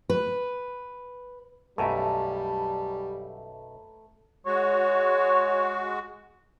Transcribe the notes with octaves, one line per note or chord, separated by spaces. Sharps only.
B4
B1 F#2 G3 A3 A#5 B5
G#3 F#4 C#5